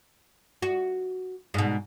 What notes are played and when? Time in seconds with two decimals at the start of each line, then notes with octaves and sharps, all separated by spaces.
0.62 F#4
1.54 G#2 B2